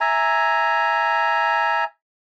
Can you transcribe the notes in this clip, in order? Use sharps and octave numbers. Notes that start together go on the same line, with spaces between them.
E5 G#5 A#5